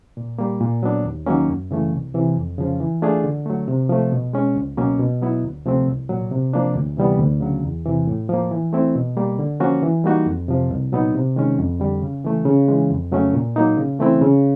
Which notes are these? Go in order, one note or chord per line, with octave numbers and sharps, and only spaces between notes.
A#2
G3 A#3
A#2
F#3 B3 D4
D#2
D#3 F#3 A#3 C#4
F#2
C#3 E3 A3
C2
C3 E3
F2
C#3 F3
E3
A3 D4 F4 G#4
D3
F#3 A3
C3
F3 A3
B2
G#3 C#4
C#2
B2 F#3 A#3 C#4
B2
F#3 B3 E4
D2
C3 F3 A3 C4
C2
A#2 F#3
C3
F3 A#3 D4
D2
C3 E3 G3 B3
D2
C#3 F#3
E2
C3 E3
A2
F3 A#3
E3
A3 C4 E4
B2
G3 A#3
D3
F3 A#3 C#4 F#4
E3
G3 A#3 D#4 F#4
F2
C3 F3
C2
A#2 F#3 B3 D#4
C3
D#3 G#3 C#4
F2
D3 G3
C#3
E3 A3
C#3
E3 G#3
F2
C#3 F#3 A3 C#4
A#2
F#3 A#3 D#4
C#3
E3 A3 C4 E4
C#3